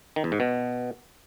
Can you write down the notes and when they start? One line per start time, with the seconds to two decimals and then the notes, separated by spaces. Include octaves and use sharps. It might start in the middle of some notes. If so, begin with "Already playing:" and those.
0.16 D#3
0.24 E2
0.32 G#2
0.40 B2